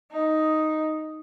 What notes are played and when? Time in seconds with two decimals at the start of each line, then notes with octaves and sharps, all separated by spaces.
0.11 D#4